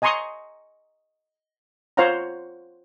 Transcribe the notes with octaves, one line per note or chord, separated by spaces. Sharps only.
D#5 G#5 A#5 C6 C#6 D#6
F4 C5 C#5 F5 F#5 A#5